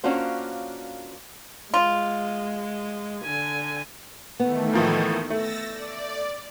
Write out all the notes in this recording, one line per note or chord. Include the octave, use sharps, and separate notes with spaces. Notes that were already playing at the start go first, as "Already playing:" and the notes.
A#3 C#4 D4 F4 F#4 C5
G#3 F4
D3 G#5
D#3 E3 A3 B3
A2 F3 A#3
A3 E6 A6 A#6
D5